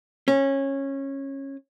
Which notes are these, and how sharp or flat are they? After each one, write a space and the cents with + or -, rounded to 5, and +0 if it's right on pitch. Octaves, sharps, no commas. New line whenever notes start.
C#4 -20